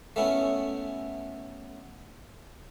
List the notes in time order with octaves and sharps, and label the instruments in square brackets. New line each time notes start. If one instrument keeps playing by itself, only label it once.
[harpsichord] A3 B3 C#4 E4